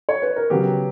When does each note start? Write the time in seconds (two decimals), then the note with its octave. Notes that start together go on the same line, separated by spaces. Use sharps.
0.09 C#5
0.22 B4
0.36 A#4
0.50 C#3 F#3 B3 G4